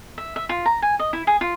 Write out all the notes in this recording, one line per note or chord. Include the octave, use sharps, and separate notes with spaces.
E5
E5
F4
A#5
G#5
D#5
E4
G#4
F4